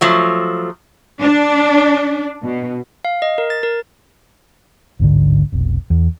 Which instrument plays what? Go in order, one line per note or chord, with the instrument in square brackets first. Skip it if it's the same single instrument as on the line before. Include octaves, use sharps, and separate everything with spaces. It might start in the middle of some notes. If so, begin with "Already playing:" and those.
[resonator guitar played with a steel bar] F3 F#3 A3
[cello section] D4
B2
[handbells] F5
D#5
A#4
A6
A#4
[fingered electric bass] A1 D2 G#2 D3
F1 B1
E2